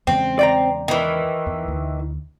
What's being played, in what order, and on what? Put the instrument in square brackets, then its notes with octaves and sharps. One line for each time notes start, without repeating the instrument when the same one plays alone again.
[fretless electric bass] E2 C#3 G#3 [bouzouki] C4
[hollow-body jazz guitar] D5 G5 A#5
[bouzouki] D#3 E3
[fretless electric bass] E2
D2